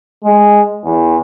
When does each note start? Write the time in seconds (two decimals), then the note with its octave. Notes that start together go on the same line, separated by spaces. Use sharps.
0.23 G#3
0.83 E2